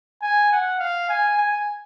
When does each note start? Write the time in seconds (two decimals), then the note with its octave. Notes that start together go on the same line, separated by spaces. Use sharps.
0.22 G#5
0.51 F#5
0.79 F5
1.09 G#5
1.37 G#5